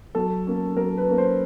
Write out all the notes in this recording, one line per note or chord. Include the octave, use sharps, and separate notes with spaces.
F#3 A4
A#3 C#4
F#3 A#4
B4
A#3 C#4
C5